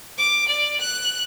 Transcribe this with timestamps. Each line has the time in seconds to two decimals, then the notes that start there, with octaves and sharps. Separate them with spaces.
0.18 D6
0.48 D5
0.80 F#6